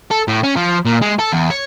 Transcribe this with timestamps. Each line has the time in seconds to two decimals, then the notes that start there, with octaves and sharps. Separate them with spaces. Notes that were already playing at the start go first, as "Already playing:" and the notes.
0.11 A4
0.28 A2
0.43 C#4
0.56 F3
0.85 A#2
1.02 G#3
1.19 A4
1.33 E2
1.50 C#5